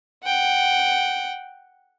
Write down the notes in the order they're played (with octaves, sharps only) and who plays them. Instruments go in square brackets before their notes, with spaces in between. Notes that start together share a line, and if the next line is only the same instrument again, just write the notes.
[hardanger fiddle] F#5 G5